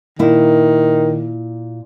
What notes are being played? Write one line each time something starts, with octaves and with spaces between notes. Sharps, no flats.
A#2 D#3 E4